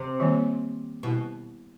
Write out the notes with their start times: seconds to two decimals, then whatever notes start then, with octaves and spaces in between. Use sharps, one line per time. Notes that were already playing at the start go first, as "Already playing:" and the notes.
Already playing: C3
0.20 D#3 G3 A#3
1.03 B2 G3 B3 E4 G4